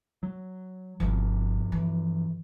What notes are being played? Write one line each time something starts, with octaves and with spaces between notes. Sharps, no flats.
F#3
G1 G2 C3 F3
E3